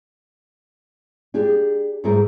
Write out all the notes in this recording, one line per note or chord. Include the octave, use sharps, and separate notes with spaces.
D4 G4 G#4
G#2 G3 A3 G#4 A#4